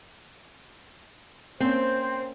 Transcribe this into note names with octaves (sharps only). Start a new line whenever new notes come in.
A#3 C4 C#4 C5